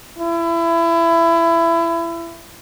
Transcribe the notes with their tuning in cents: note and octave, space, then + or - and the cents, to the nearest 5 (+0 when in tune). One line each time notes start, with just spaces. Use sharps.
E4 +25